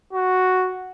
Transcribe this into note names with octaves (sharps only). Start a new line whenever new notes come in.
F#4